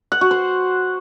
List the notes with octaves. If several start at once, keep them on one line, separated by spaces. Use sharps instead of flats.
F#5
F#4
C5